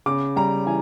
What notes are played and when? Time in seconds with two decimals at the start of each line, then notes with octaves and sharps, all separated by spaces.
0.06 C#3 D6
0.36 G3 A#5
0.66 E3 G#5